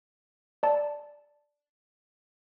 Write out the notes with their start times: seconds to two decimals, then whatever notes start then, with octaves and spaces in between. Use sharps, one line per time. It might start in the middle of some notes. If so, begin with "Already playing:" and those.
0.63 D5 A5